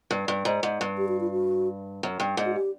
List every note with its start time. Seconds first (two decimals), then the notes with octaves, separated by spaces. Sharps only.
0.11 G2
0.28 G2
0.45 G#2
0.63 G#2
0.81 G2
0.98 G4
1.08 F#4
1.20 F4
1.31 F#4
2.03 F#2
2.20 G2
2.37 G#2
2.45 F#4
2.55 G4